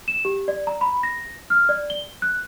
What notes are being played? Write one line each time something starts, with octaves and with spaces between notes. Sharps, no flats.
E7
G4
D5
A#5
B5
A#6
F6
D5
G7
F#6